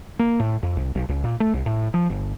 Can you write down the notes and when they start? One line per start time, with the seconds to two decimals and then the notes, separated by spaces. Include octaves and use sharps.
0.19 A#3
0.40 A2
0.63 F2
0.77 C2
0.95 B1
1.09 C#2
1.24 A#2
1.40 A3
1.54 C2
1.66 A2
1.94 F3
2.10 G1